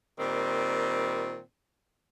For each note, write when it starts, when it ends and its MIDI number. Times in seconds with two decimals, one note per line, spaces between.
0.19 1.40 46
0.19 1.40 51
0.19 1.40 55
0.19 1.40 60